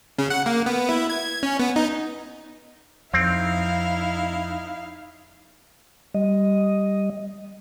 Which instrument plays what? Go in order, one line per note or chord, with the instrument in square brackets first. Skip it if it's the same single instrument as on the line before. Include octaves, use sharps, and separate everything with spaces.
[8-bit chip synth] C#3
F#5
A#3
B3
E4
G#6
C#4
B3
D#4
[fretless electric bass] F2 [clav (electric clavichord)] C4 [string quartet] D#4 E4 F5
[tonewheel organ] G3 D#5